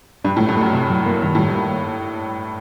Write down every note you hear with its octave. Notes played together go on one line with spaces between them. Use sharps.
G2 D4
A2
A3
G2
F#2 A3
G2 C3
F#3
A#3
G2 D#3
A2 G3
G2
A#3